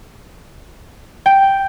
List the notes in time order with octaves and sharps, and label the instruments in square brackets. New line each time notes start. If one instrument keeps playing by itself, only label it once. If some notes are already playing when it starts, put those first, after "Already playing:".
[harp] G5